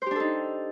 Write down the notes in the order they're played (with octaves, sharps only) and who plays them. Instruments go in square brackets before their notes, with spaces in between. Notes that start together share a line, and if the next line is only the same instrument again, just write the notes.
[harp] C5
G4
D4
A4
D#4